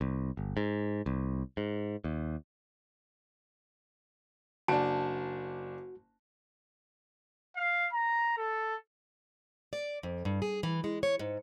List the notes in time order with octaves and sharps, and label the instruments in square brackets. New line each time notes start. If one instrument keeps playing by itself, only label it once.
[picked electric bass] C2
G1
G#2
C2
G#2
D#2
[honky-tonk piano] F#1 D4 [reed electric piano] F#4 [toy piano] A5
[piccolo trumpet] F5
A#5
A4
[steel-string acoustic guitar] D5
F2
G2
G#4
E3
G#3
C#5
G#2